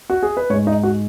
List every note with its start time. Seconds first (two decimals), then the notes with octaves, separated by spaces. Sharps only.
0.10 F#4
0.23 G#4
0.37 B4
0.50 G#2 C#5
0.53 G#3
0.67 D#4
0.83 F#4